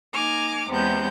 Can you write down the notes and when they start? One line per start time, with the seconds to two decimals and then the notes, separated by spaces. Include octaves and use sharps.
0.13 A#3 D#4 G#5 D6 F6
0.69 E2 C3 G#3 B3 C#4 G6